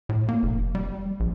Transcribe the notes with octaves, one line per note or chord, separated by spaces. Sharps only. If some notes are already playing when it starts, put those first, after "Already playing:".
A2
A#3
F1
G3
A#1